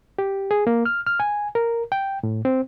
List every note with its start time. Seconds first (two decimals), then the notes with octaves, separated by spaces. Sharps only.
0.19 G4
0.51 G#4
0.67 A#3
0.85 F6
1.07 F6
1.20 G#5
1.55 A#4
1.92 G5
2.23 A2
2.45 C4